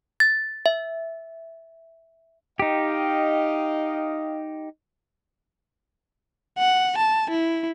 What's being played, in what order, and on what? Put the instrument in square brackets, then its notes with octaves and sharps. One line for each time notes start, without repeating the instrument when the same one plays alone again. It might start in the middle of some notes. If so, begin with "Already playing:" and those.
[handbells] A6
E5
[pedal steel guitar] D#4 G4 [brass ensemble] D#5 F5 G5
[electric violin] F#5
A5
E4